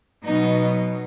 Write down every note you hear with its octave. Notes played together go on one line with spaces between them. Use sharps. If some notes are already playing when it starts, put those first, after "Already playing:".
B2 F#3 B3 D#4